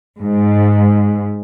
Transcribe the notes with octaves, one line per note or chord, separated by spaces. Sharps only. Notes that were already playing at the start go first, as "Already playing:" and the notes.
G#2